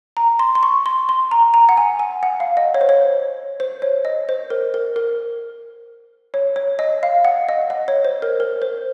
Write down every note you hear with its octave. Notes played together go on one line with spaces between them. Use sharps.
A#5
C6
C6
C#6
C6
C6
A#5
A#5
F#5
G#5
G#5
F#5
F5
D#5
C#5
C5
C#5
C5
C#5
D#5
C5
A#4
A#4
A#4
C#5
C#5
D#5
F5
F#5
D#5
D#5
C#5
C5
A#4
A#4
C5